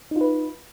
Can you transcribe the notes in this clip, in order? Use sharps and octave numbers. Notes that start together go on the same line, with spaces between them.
D#4 F4 B4